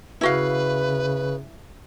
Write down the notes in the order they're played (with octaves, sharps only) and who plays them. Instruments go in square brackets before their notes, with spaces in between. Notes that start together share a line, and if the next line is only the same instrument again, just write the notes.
[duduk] C#3 [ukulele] E4 F#4 F5 [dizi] B4